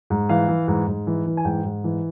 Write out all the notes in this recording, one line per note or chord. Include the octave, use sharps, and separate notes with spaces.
G#2
E3 F5
E3
G#2
G#2
E3
E3
G#5
G#2 G5
G#2
E3